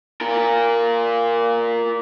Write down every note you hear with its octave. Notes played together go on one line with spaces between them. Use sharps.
F4 A#4